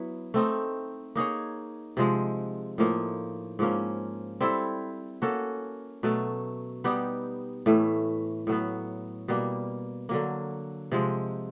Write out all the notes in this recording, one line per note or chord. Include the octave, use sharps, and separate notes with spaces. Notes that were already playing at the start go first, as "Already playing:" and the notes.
Already playing: F#3 B3 E4
A3 C4 D#4
A#3 D#4 G#4 C#5
C3 F3 G#3
A2 F3 A#3 D#4
G#2 F3 A#3 C#4
G3 C4 E4 A4
A#3 C#4 F#4 A4
B2 F#3 A3
G3 B3 D#4 G4
A2 E3 A3
A2 F#3 B3
B2 G3 A#3
D3 F#3 A#3
C3 F3 G#3